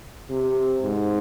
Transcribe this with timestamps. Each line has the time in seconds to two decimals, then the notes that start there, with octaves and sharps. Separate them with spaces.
0.30 C3
0.82 G#2